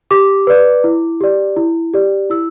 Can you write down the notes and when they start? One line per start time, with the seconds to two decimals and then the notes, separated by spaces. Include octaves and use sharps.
0.11 G4 D6
0.47 B4 D5
0.84 E4
1.21 G4 D5
1.57 E4
1.94 G4 D5
2.30 E4 E6